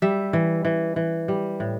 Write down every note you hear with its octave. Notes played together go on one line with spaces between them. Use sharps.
G3 E5
E3
E3
E3
G3
A2